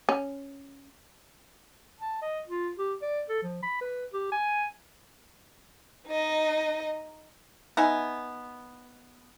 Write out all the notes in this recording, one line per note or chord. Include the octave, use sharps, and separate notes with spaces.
C#4
A5
D#5
F4
G4
D5
A4
F3
B5
B4
G4
G#5
D#4 D#5
B3 D#4 E5 G#5